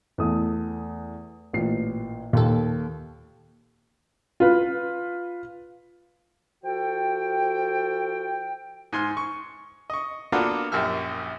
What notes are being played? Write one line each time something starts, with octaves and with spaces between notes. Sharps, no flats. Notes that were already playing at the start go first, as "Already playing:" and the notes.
E2 A3 D#6
A1 A#2 C7
D#2 A#2 A4
F4 B4
F3 F#4 A4 G5
G#2 G#5 C6 F6
C#6
D#5 C#6
A#3 B3 D4 F4 F#4 A4
A#1 F#2 G4 E5 F6